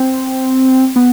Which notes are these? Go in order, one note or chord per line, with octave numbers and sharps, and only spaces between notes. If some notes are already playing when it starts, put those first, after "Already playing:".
Already playing: C4
B3